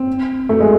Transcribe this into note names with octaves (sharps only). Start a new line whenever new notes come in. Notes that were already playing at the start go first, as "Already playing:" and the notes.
Already playing: C4
A3
G#3